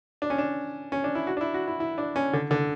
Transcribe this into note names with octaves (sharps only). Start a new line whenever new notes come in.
D4
C#4
D4
C#4
D4
E4
F#4
D4
E4
F#4
E4
E4
D4
C#4
D3
D3